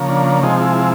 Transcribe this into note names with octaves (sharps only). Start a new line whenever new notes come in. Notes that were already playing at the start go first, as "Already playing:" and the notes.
Already playing: C#3 F3 A#3
D4
C3 F3 G#3 D#4
E4